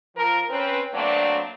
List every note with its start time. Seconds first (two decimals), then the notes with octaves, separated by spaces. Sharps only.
0.16 F3 A#4
0.49 C4 C#4 B4
0.93 F#3 A3 A#3 C4 D4